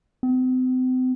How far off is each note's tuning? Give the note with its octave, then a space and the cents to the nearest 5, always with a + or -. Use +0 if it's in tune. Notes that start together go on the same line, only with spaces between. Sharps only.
C4 -40